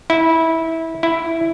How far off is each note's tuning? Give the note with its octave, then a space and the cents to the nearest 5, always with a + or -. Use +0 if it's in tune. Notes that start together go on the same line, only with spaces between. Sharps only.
E4 -20
E4 +0